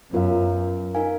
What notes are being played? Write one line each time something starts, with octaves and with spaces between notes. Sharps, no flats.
F#2 B3 F4 A#4 F5
D#4 A#4 F5 G#5